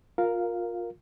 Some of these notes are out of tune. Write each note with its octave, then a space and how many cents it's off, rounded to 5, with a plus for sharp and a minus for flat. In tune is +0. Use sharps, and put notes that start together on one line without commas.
F4 +20 A#4 +0 F5 +0